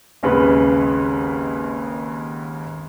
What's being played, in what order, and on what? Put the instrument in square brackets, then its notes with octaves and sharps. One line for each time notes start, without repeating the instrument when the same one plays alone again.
[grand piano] G#1 D#2 C#3 B4